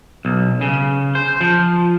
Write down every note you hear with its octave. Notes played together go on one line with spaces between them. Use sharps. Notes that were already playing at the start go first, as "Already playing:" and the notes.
B1
C#3
C5
F3